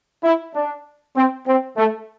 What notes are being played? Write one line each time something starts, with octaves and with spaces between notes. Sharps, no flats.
E4
D4
C4
C4
A3